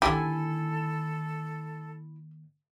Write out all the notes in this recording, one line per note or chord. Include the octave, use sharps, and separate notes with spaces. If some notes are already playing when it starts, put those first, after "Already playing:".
A#2 D3 D#3 E4 G4 A4 G#5